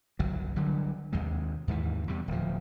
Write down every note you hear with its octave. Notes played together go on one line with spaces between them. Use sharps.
G1 C2 F#3
D3 F#3 G3
D#2 C3 G#3
D#2 G#2 D#3 E3
E2 C3 G3
D1 F3